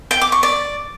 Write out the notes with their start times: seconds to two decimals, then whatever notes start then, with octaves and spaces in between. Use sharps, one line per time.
0.11 G5
0.21 D6
0.32 C#6
0.43 D5